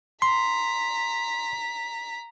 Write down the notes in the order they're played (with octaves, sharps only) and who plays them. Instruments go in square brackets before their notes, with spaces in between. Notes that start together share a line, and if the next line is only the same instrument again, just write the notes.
[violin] A#5 B6 [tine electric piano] C6